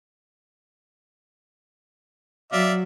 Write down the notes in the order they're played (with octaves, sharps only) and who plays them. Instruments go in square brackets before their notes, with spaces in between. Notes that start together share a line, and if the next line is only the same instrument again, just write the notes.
[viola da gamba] F#3 [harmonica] D5 E5 F5